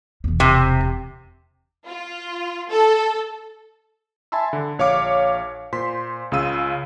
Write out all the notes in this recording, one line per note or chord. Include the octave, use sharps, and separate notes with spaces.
E1 E2
C3
F4
A4
E5 G#5 A5 B5 C6 E6
D3
A#1 C#5 F5 D6 C#7
A#2 C5 C6 B6
C#2 C#3 F4 F5 E6 D#7